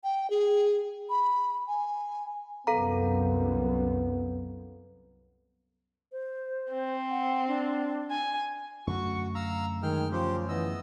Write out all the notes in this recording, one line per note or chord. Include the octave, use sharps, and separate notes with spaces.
G5
G#4
B5
G#5
C2 F#2 B3 A4 F5 A#5
C5
C4
F#5
D4
G#5
F#2 D3 A3 F#4 C#6
F5 A#5 E6
D#3 G#3 G5 F6
C#3 F3 G4 C5
E3 B3 D#5 E6